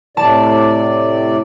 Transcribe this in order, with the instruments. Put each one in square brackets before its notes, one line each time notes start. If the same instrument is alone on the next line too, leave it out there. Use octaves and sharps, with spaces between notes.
[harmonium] A2 C3 D5 [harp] A5